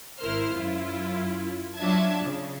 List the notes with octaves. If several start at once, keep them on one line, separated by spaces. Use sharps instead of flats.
G#1 E4 A#4 C5 F6
F#2 E4 F4
F#3 D4 F4 E5 A5 G#6
C#3